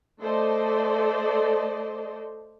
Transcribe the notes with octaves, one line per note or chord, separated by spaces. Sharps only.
A3 A4 C5 D5 D#5